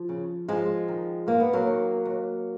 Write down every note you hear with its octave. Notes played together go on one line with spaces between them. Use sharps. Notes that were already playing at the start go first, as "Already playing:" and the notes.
Already playing: F3
C#3
G#2 F3 G#3
D#3
G#2 A#3
B3
F#3 A#3
D#3
D#2